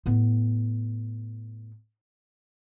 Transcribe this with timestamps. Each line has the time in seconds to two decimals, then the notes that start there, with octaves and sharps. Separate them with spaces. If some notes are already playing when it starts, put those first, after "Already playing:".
0.06 A2 B3